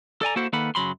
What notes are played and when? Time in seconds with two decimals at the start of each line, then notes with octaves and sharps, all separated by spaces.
0.22 A4 D5 G#5 A#5
0.36 A#3 E4 F#4 A4 C5 F#5
0.53 D#3 A#3 A4 B4 F#5 B5
0.75 F#2 C#3 F#3 B5 C6